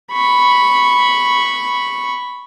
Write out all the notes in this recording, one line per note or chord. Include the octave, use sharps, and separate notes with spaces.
B5 C#6